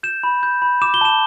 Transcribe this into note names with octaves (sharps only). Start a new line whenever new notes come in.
G6 E7
B5
G6
B5
D6 E7
G7
A5 E7